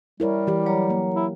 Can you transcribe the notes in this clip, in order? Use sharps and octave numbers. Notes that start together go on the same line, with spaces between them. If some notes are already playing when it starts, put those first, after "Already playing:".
G3 E4 A#4 C#5
E3 G4
F#3 C#5 A#5
A#3
E4